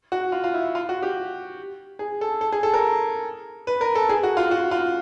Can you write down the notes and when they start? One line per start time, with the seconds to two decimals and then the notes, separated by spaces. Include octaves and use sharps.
0.12 F#4
0.32 F4
0.44 F4
0.54 E4
0.75 F4
0.89 F#4
1.03 G4
1.99 G#4
2.21 A4
2.41 A4
2.52 G#4
2.63 A4
2.74 A#4
3.67 B4
3.81 A#4
3.95 A4
4.09 G#4
4.23 F#4
4.37 F4
4.51 F#4
4.71 F4